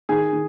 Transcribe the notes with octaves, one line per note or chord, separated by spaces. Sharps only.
D#3 G#4 G#5
D#3